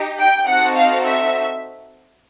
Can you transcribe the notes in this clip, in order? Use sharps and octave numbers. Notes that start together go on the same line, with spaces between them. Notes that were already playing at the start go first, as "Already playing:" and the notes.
Already playing: D#4 G4
G5
C4 D#4 F#4 A4 F#5
F5
E5